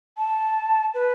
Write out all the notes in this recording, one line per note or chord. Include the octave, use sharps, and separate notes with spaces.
A5
B4